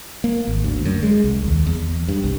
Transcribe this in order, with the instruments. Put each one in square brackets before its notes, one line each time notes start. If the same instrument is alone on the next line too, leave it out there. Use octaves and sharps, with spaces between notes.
[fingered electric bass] A#3
G#1
D2
F#2
G#3
C2
D#2
E2
G2
C2